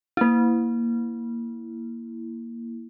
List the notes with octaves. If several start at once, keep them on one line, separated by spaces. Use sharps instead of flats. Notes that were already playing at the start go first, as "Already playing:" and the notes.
A#3 E4